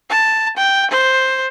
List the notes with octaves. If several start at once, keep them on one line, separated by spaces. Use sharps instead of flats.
A5
G5
C5